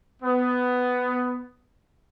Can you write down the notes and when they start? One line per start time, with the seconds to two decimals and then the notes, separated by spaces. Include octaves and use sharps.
0.23 B3